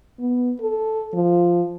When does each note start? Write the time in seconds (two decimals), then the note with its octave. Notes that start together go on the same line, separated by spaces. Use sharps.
0.19 B3
0.60 A4
1.13 F3